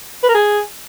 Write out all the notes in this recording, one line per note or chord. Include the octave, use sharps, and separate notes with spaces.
B4
A#4
G#4